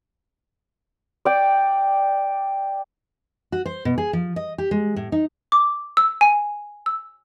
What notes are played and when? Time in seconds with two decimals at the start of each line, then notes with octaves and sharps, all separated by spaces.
1.25 D5 G5
3.52 F#4
3.66 C5
3.85 B2
3.98 G#4
4.13 F3
4.36 D#5
4.58 G4
4.71 G#3
4.96 A2
5.12 D#4
5.52 D6
5.97 E6
6.21 G#5
6.86 E6